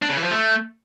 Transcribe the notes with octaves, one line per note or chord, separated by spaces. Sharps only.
D4
C#3
E3
F3
A3